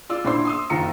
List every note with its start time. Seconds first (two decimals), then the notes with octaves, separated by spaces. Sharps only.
0.10 F4 D5 E6
0.25 A#1 D4 E4 C5 C6
0.45 C6 D#6 E6
0.70 F#1 D#3 F4 A#5 C#7